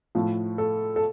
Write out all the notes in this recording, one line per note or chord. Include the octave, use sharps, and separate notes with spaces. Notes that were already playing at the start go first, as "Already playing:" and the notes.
A2 F3 A3
A4
A4